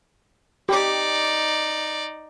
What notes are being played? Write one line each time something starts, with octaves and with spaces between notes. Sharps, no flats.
D#4 G4 D5